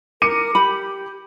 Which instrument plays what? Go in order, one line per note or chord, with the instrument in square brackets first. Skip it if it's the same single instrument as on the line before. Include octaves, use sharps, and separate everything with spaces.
[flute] A#4 [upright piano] D6 C#7 D#7
[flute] G4 [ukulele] B5